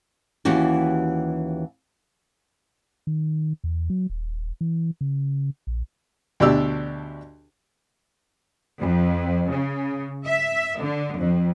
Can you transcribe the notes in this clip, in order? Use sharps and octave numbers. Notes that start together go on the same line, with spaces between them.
D#2 E3 C#4 F#4 G4
D#3
E2
F#3
D#1
E3
C#3
A#1
D2 B2 D4 G4 D5 E6
F2
C#3
E5
D3
F2